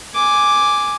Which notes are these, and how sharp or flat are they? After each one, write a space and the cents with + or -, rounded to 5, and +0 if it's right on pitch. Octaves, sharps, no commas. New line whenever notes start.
G#5 +0 D6 +0